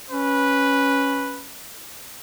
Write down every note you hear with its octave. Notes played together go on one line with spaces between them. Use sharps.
C#4 B4